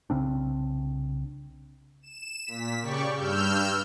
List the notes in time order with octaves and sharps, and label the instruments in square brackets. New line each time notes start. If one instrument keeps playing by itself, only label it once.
[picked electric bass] C2 C#3 C4 D4
[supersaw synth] E7
A#2 B6
C#3 G4 D5 C#6
G2 E6 F6 G6